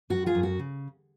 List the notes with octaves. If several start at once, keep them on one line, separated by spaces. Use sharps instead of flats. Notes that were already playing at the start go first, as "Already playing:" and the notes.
F#2 F#4
F4 G#4
F#2
F#4
C#3